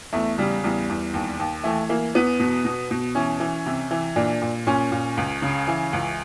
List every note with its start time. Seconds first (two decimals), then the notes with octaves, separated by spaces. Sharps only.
0.13 E2 A3
0.38 C#3 G3
0.64 E2 G3
0.89 E2
1.13 D#2
1.39 D#2
1.64 E3 A3
1.89 E3 A#3
2.15 E2 B3
2.40 B2
2.65 B2
2.91 B2
3.15 E3 C#4
3.40 E3
3.66 C3
3.91 E3
4.16 A#2 D4
4.42 A#2
4.67 A#2 C#4
4.91 A#2
5.17 C#2
5.42 C#3
5.68 E3
5.93 C#2